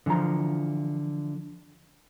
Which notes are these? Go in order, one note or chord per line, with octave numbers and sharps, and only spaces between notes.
D3 E3 F3 F4 A#5